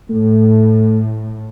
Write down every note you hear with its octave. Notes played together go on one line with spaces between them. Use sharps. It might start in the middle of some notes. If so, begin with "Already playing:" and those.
A2 A3